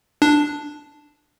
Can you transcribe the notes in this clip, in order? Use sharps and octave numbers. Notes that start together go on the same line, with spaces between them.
D4